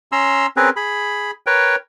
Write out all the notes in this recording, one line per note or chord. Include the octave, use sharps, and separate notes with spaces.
C#4 A#5 C6 E6
C4 C#4 G#4 A#4 B4
G#4 B5
A#4 B4 C#5 G5